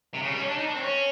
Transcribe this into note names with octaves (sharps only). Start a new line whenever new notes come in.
C3
C#3
G3
C#4
D4
D#4
D4
C4
C#4